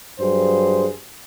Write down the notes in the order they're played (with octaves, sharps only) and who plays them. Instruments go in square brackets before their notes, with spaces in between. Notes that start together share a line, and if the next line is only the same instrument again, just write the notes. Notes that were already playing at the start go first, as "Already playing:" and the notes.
[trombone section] G2 F#3 G#4 C5